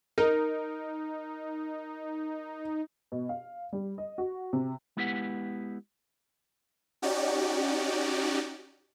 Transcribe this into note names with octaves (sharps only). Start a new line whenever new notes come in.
D#4 A#4
B2
F5
G3
D#5
F#4
C3
G#3 B3 E4 G4 B4 F#5
C#4 D#4 F#4 G4 D5